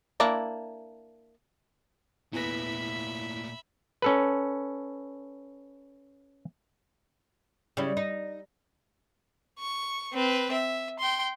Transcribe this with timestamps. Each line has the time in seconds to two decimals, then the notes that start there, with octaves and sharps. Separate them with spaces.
0.20 A#3 D4 E4
2.33 E2 A#2 A3 E4 B4 E5 B5 A#6
4.02 C#4 A4 B4
7.77 C#3 G3 E4
7.97 D#4
9.59 C#6
10.13 C4 B4
10.52 E5
10.99 G5 C6